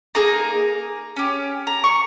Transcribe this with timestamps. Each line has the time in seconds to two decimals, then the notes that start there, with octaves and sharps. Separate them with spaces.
0.15 A#3 D#4 G#4 A#5
1.16 C#4 G4
1.67 A#5
1.84 C#6